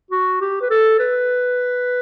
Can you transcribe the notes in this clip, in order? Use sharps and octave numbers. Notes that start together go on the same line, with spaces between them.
F#4
G4
B4
A4
B4